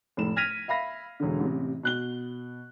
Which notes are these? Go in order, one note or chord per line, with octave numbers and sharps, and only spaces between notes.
F1 A2 E7
F6 G#6 A#6 B6 D#7 F7
E5 F5 B5 A#6
E1 D3
A1 C3
B2 F#6 G7